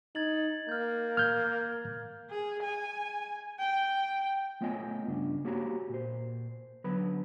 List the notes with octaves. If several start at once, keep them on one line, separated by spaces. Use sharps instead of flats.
D#4 G#6 A6 F#7
A#3 F6 G6
F6 G6 G#6
G#4
G#5
G5
A3 B3 F4 C#5 D#5 G#5
G2 C#3 D4
A#3 F#4 G4 C#5 A#5
A#2 C5
D3 F#3 B3 B4 B5